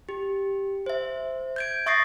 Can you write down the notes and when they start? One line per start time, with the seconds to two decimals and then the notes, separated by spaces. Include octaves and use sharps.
0.09 G4
0.86 C5 E5
1.56 G6 G#6 D7
1.86 E5 C#6 D#6 A6 A#6 C7